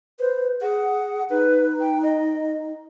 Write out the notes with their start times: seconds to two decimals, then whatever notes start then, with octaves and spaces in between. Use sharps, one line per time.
0.19 B4 C5
0.61 G#4 F#5
1.30 D#4 B4
1.80 G5
2.03 D#5